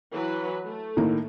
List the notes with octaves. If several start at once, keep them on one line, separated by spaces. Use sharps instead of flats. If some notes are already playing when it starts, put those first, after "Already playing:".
E3 F#3 B4
A3
A2 D#3 A#3